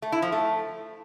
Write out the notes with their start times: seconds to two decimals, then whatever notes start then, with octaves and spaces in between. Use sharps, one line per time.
0.02 A3
0.12 E4
0.22 F3
0.32 A3